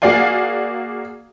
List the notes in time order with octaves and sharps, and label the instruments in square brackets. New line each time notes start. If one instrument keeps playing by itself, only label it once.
[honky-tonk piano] A#3 F#4 G#4 D5 F5 G#5